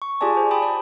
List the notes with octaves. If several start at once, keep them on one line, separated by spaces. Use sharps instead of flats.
C#6
F4 G4 G#4 D5 G#5 A5
C5
G5 A5 B5 D#6
D5